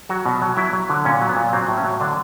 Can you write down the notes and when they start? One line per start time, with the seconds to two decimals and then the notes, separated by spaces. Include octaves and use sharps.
0.09 F#3 F#4
0.25 B2
0.42 F#3
0.57 F#3 E4
0.73 F#3
0.90 D3
1.05 A#2 C#4
1.21 F#3
1.29 B3
1.37 A#2
1.53 F#3 C4
1.68 A2
1.77 C#4
1.84 F#3
2.01 D3 D4